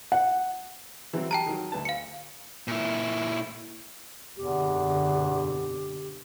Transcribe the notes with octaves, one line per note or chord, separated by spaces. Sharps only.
F#5
E3 F#3 C4
G4 G5 A5 A#5
D#3 F#3
D2 B4 A5
F5 C#7
A#2 E4
F#1 E2 B2 D3 G4